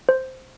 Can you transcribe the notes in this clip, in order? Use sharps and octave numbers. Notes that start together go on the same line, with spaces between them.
C5